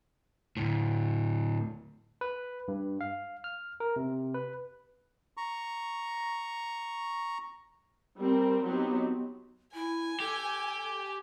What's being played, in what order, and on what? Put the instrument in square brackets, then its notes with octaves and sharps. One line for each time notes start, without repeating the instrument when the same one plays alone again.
[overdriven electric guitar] D2 A2
[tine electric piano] B4
G2
F5
F6
A#4
C3
B4
[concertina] A#5 C#6
[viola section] G3 C4 A#4
F#3 B3 C4 D#4 G4
[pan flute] E4 [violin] G#5
[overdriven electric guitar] G4 [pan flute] A4